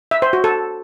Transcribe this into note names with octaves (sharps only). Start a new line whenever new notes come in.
E5
C5
F#4
A4